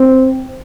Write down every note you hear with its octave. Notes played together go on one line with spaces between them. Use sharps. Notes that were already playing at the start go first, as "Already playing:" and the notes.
Already playing: C4